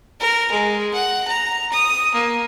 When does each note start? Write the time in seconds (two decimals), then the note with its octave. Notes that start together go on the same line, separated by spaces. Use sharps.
0.20 A#4
0.52 G#3
0.94 F#5
1.28 A#5
1.72 D#6
2.14 A#3